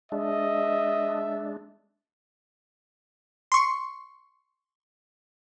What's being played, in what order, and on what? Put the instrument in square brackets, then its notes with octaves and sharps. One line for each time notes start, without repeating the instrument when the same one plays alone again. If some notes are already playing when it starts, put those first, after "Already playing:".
[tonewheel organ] G#3 D4 [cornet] D#5 [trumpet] E5
[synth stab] C6 C#6